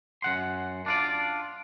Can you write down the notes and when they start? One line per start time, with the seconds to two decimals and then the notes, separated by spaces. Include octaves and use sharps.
0.22 F#2 F#5 C6
0.86 D4 F4 D5